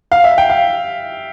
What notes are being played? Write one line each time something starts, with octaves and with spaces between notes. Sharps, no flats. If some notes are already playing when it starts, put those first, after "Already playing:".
F5
E5
G5
F5